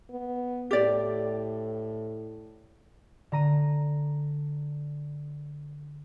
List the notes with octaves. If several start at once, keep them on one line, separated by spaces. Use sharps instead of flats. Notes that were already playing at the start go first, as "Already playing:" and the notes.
B3
A2 G4 D5
D3 A#5 D#7